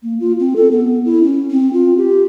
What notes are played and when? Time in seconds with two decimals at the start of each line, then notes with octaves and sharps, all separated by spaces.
0.03 A#3
0.20 F4
0.40 C4
0.56 A4
0.71 B3
1.05 E4
1.23 C#4
1.51 C4
1.73 F4
1.97 G4